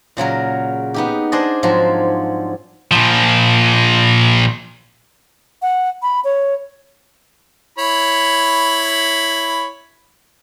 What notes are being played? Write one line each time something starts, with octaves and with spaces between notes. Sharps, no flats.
A#2 C#3 F#3 A#4
B3 D#4 G4
D4 G#4 C5 D5 D#5
G#2 F3 F#3 C4
A#2 F3
F#5
B5
C#5
E4 C#5 B5